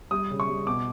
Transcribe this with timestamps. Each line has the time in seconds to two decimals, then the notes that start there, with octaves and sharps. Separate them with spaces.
0.11 G3 D#6
0.31 C#3
0.40 C#6
0.49 G3
0.67 B2 D6